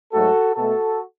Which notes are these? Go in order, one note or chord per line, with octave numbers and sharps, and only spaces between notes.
G#2 F#3 A3 F#4 A4
B2 A3 F#4 A4